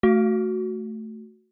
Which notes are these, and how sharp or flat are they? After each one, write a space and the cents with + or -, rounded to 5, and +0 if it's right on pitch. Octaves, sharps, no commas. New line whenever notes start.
A3 +0 F#4 +0